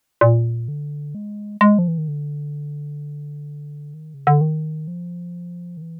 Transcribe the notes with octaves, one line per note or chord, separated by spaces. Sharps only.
A#2
D3
G#3
G#3
F3
E3
D#3
D3
D#3
C#3
D3
D#3
F3
D#3
E3